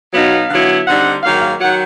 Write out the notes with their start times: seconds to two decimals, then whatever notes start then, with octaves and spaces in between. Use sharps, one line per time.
0.13 B2 F#3 B3 D#4 F5
0.50 D3 F#3 B3 E4
0.86 D3 G3 C4 D#4 F#5
1.23 G#2 D#3 F#3 A#3 F5
1.42 F5
1.60 D#3 F#3 F#5